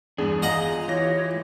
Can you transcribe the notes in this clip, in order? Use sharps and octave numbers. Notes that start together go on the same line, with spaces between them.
E2 G2 B3 D4 G#4
F4 D#5 F#5 A#5
E3 G4 C#5 A#6